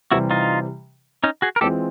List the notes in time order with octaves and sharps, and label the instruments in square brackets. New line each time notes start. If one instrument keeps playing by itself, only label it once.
[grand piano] C3 E3 G3 [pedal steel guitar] E4 F#4
[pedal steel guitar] D#4 F4
C#4 D#4
F#4 G#4
A#4
[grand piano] E3 G#3 C4 F4 [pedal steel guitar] G4 A4